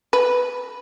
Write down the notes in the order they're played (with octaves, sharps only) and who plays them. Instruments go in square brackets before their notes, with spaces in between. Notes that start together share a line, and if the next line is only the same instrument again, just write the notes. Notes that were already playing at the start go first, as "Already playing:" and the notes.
[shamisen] B4